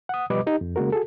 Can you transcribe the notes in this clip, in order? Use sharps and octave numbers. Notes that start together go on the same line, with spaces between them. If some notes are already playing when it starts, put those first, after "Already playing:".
F#5 D#6
B2 F3 G3 B4 D#5 D6
D#4 G4
F2
C#3 G#3 A#3 F#4 A#4
F#4 G#4 A4